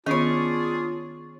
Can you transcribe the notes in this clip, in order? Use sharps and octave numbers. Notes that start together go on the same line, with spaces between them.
D#3 B3 C#4 D4 F4 G#4 C#5